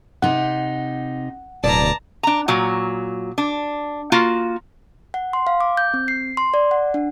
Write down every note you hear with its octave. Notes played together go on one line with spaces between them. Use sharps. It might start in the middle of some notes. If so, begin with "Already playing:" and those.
C3 D#4 F#5
D1 B2 D5 A5 A#5
D4 A#5
A#2 F#3
D4
A#3 F4 F#4
F#5
C6
F5
D6
G6
C4
C7
C6
D5
F#5
D4